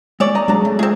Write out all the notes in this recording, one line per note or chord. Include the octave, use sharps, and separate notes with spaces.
G#3 E4 C#5 D5
D#5 A#5
F#3 G#3 D4 A#5
A3
G#3 A3 C4 F4 G#4